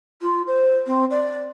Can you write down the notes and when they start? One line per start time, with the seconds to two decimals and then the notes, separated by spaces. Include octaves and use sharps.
0.21 F4
0.47 C5
0.86 C4
1.10 D5